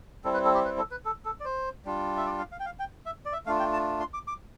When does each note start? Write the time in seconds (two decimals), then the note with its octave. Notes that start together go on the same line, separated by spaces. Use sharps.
0.24 G3 C4 E4 A4
0.34 B4
0.45 A4
0.55 G4
0.65 B4
0.78 A4
0.91 B4
1.05 A4
1.25 A4
1.40 D5
1.45 C5
1.85 G3 D4 F4
2.17 E5
2.26 D5
2.39 F5
2.52 F5
2.60 G5
2.66 F5
2.80 G5
3.06 E5
3.26 D5
3.33 E5
3.46 A3 D4 F4 F5
3.60 G5
3.73 A5
4.00 C6
4.14 D6
4.27 D6